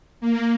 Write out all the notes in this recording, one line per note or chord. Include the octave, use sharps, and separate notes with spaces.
A#3